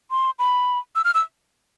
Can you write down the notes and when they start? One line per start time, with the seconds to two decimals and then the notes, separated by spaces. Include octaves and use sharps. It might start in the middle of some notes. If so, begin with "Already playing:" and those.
0.11 C6
0.39 B5
0.96 E6
1.05 F6
1.14 E6